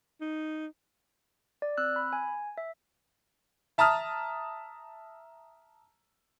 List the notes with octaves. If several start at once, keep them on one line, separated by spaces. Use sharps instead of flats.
D#4
D5
C4 E6 F#6
B5
G#5
E5
E5 A5 A#5 D#6 F6